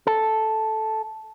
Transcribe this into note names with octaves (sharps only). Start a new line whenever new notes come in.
A4